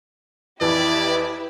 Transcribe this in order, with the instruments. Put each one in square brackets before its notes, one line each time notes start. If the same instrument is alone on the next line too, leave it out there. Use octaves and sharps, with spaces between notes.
[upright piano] F2 E3 [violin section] E4 G4 B4 [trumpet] D5